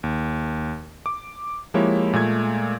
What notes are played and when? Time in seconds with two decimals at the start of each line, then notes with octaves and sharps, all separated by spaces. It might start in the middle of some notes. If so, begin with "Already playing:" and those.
0.03 D#2
1.06 D6
1.74 F3 G#3 A#3 E4 G4 C#5
2.13 A#2 G#3 A3 G#6